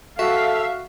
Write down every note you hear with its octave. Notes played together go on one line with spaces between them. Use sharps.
F#4 A4 E5 F5